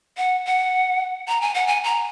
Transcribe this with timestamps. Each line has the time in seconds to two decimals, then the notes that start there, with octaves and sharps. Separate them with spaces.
0.17 F#5
0.46 F#5
1.28 A#5
1.41 G#5
1.54 F#5
1.67 G#5
1.84 A#5